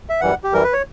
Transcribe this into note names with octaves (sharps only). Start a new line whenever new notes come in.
E5
F#2 E3 G3 F#5
G4
F#2 E3 G3 A#4
B4
C#5